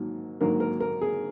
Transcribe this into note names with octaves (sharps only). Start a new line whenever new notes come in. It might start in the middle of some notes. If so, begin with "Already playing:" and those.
Already playing: G#2 D#3 F#3 A#3
G#2 D#3 F#3 A#3 A#4
A#4
A#4
G#4